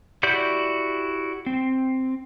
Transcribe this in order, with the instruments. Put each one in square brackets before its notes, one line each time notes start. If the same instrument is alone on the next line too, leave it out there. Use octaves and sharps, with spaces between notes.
[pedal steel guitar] E4 F#4 G4 D5 G6
C4